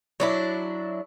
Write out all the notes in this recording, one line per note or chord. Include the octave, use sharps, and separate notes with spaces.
F#3 D4 E4